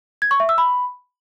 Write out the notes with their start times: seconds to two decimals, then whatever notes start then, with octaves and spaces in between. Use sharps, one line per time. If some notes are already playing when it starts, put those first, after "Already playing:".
0.22 G#6
0.31 C#6
0.40 E5
0.49 E6
0.58 B5